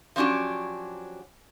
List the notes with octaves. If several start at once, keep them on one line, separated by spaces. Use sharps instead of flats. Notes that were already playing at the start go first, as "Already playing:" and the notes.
F3 F#3 C#4 D4 G4